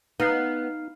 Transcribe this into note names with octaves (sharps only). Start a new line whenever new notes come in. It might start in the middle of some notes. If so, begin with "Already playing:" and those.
B3 D#4 F5 F6 C7